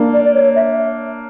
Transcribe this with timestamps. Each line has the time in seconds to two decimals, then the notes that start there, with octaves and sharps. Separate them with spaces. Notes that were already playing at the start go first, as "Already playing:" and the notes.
Already playing: A#3 D4
0.14 D5
0.25 D5
0.34 C#5
0.56 E5